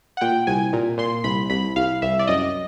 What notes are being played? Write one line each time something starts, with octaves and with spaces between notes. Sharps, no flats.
F#5
A#2 G5
C2 G#5
A#2
A#2 C6
C2 B5
C2 B5
C2 F5
C2 E5
D5
F#2 D#5